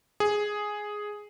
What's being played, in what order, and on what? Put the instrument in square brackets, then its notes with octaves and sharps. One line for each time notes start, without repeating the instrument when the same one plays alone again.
[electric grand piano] G#4